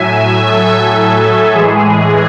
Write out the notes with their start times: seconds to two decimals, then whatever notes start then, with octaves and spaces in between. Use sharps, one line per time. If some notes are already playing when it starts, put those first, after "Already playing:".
Already playing: A2 F#3 E5 G#5
0.46 A4
1.52 A2 E3 G#3 G#4